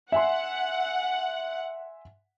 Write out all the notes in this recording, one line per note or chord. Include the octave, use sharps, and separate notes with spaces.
E5 F#5 G#5 C6